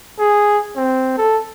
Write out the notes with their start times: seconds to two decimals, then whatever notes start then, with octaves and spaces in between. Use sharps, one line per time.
0.19 G#4
0.76 C4
1.18 A4